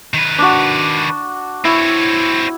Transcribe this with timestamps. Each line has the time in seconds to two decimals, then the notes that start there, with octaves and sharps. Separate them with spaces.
0.14 D#3 B4
0.39 D4 F#4
1.65 C4 E4 C#5